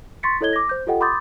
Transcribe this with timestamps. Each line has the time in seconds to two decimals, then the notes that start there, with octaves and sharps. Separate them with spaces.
0.23 C6 C#6 A6 B6 C#7
0.41 E4 A4 C#5 D#5 G#6 G7
0.53 D6 A#6
0.69 C5 G6
0.87 F4 G4 A4 D#5 F#5 G5
1.01 B5 C6 D6 D#6 G6 A6